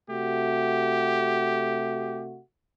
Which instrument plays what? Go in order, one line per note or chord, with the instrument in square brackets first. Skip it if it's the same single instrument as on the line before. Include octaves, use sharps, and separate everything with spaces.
[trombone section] C3 A3 F#4 [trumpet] G4